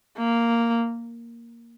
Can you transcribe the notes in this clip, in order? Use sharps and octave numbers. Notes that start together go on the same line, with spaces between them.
A#3